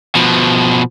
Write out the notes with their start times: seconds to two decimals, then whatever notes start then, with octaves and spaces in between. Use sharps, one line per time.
0.15 B2 F3